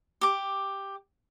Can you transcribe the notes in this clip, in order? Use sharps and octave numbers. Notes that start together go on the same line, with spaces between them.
G4 D6